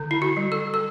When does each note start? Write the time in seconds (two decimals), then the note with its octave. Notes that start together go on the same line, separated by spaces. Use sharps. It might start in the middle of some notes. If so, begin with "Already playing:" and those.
Already playing: D3
0.11 E4
0.22 F#4
0.37 G3
0.52 A4
0.74 A4